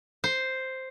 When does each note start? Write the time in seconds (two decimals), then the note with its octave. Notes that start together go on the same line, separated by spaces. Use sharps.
0.24 C5